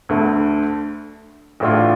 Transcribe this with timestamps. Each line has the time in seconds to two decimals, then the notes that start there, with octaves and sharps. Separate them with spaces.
0.09 D2 D3 A3
1.60 A1 A2 A3 D4 F4